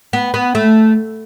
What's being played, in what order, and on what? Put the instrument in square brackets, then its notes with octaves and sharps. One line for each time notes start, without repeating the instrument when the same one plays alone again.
[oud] B3
B3
A3